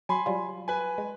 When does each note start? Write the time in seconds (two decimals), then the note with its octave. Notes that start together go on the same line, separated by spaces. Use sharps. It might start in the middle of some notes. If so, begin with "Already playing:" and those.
0.09 F#3 G#5 B5 C6
0.26 F#3 G3 F4
0.68 B4 G#5
0.98 G#3